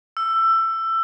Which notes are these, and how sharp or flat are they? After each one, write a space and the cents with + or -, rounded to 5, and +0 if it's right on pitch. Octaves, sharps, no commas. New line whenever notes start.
E6 +20